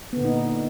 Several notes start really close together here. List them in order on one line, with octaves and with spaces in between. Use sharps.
B3 D3 A#2 D#4